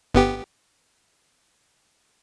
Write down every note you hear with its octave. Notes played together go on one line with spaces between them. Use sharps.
G1 B3 G4